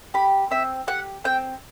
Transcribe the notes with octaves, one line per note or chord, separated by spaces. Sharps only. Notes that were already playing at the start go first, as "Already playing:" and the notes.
G4 B5
C4 E5
G4 F#5
C4 G5